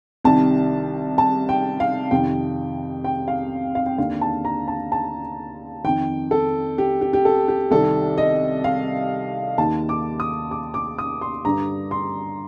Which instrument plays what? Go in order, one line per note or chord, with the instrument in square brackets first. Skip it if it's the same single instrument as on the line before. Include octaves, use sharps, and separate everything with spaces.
[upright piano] C2 C3 D#3 A5
A5
G5
F5
F2 C3 D#3 G5
G5
F5
F5
G5
D#2 D3 F5
A5
A#5
A5
A5
F2 D#3 G5
A4
G4
G4
G4
A4
G4
C2 C3 D#3 A4
D#5
F5
D#2 D#3 A5
D6
D#6
D6
D6
D#6
C6
G2 D3 A#5
C6